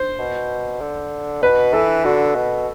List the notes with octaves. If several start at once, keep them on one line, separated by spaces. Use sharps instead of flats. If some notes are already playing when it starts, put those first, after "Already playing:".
Already playing: C5
B2
D3
B2 B4
E3 A4
D3 F#4
B2